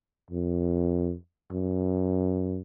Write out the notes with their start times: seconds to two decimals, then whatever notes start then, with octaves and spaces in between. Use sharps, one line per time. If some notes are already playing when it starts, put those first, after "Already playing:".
0.30 F2
1.51 F#2